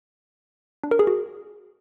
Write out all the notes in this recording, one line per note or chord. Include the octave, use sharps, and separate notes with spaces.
D4
A#4
G#4
F#4